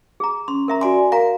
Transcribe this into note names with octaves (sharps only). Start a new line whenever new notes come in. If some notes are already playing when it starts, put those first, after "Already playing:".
G#4 A#5
C#4 C6
A#4 E5 A#5
F#4 D5 G#5 C6
A#4 F5 A#5